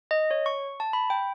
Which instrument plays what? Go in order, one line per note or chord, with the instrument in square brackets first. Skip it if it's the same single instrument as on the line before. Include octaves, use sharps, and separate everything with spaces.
[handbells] D#5
C#5
C#6
A5
B5
G5